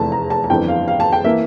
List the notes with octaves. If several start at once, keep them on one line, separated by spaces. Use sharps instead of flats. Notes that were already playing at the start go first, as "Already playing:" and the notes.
Already playing: F1 E2 E3 A3 A5
A#5
A5
A5
G1 F2 E3 G5
F5
F5
A5
G5
E3 A#3 E5